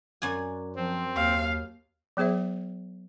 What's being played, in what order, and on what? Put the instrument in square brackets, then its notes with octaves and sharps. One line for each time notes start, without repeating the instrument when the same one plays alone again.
[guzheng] F#2 D5 G#5
[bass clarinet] F3 [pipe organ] C4
[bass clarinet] D#2 [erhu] F5
[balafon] F#3 B3 G#4 C5 E5